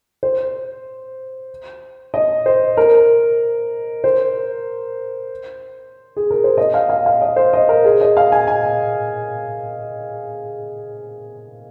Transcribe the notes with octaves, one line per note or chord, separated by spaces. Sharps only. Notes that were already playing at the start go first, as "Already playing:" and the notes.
C5
D#5
C5
A#4
C5
G#4
A#4
C5
D#5
F5
F5
F5
D#5
C5
D#5
A#4
G#4
D#5
F5
G#5
G#5